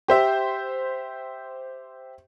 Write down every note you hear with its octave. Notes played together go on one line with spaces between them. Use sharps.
G4 C5 E5